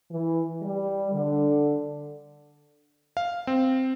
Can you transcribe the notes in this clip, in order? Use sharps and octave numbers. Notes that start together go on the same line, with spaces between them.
E3
G3
D3
F5
C4